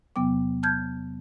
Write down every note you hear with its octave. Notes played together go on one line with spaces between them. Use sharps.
E2 C3 F#3 B3 G5 D6
A5 F6 G6 G#6